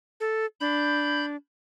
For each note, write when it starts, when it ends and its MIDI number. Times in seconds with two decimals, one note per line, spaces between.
0.20 0.46 69
0.60 1.36 62
0.60 1.26 83
0.60 1.26 91